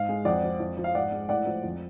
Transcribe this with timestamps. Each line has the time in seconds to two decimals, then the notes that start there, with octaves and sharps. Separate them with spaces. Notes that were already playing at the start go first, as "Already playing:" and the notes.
Already playing: G#2 F5
0.09 G#3
0.25 F2 D5 F#5
0.43 F3
0.60 F2
0.77 F3
0.84 F5
0.95 G#2 D5 F#5
1.12 G#3
1.29 A2 D5 F#5
1.46 F3
1.63 F2